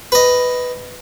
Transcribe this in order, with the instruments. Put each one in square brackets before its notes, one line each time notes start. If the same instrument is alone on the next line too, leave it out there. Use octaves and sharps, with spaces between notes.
[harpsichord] B4 D#5